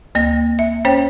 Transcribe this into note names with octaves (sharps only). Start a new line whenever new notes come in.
D2 A#3 A#6
E5
C#4 C5 C#5 G5